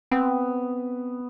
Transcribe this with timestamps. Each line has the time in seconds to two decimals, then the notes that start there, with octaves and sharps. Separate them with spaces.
0.11 B3 C4